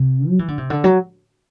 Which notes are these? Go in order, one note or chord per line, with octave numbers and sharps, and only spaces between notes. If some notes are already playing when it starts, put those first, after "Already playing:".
Already playing: C3
F#3
E3
D3
C3
D3
F#3